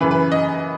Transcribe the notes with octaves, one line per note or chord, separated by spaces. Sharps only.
F#2 C#3 E3 B4
B4
D#5